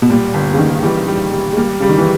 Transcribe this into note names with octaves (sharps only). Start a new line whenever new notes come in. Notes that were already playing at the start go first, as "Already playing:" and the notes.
B2
A#2 G3
G1
C#3
G1 D#3
E3 G3
G3
G3
G#3
G3 A#3
C#3 G3
D#3
E3